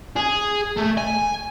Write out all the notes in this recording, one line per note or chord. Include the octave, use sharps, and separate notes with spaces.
G#4
A3
G#5